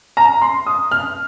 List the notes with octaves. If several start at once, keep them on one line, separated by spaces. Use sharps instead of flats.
A#5
C6
D#6
F6